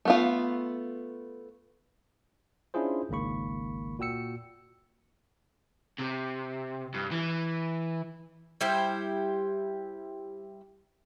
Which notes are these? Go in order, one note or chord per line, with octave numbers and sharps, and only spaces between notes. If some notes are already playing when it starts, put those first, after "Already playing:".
A3 B3 F4
C#4 D4 E4 F4 G#4 C5
G#1 C#2 D#3 A#3 B5 C#6
A#2 F#4 G5 E6 C#7
C3
G2
E3
G3 E4 G4 C5